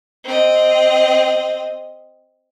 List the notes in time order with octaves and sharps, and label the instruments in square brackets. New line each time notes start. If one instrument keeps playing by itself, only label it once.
[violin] C4 D#5